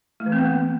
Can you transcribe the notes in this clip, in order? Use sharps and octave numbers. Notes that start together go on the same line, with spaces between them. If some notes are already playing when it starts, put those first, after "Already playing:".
A3
E3
C4
B3
A#3